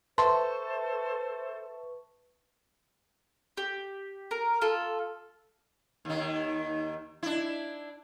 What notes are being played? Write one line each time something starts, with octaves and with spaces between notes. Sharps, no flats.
A4 B4 C5 E5 A5 C6 C#6
G4
A#4
F4 A4
D#2 D#3
D4 E4